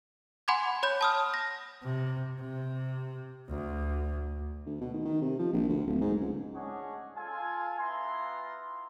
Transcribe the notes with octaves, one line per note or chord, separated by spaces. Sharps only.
F#5 G#5 B5 C6 D6 G#6
C#5 B5 G6
A5 D#6 F6
A#6
C3
C3
D2
D2
B2
D#3
D#3
C3
F3
A#1
D2
D1
G#2
C#2
C#4 D4 G#4 C#5 D#5 F#5
F4 A4 G#5
B3 E4 F4 A#5 C6